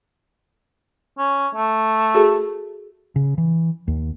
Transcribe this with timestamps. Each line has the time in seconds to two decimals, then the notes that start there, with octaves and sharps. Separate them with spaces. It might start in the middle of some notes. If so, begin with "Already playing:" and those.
1.18 C#4
1.55 A3
2.14 F#4 G#4 A4
3.16 C#3
3.38 E3
3.88 D#2